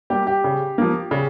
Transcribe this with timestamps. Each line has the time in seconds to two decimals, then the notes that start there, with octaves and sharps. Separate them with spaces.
0.10 G3 A#3 G4
0.27 G4
0.44 C#3
0.78 F3 A#3
1.11 C#3